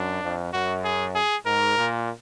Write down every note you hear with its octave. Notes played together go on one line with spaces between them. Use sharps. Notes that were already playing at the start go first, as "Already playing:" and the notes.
Already playing: F#2 D4
F2
F#2 F#4
G#4
G#4
G#2 A#4
A#2